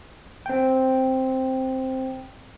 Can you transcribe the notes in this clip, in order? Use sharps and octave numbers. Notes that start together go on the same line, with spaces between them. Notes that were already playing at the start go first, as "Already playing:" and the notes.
C4 G5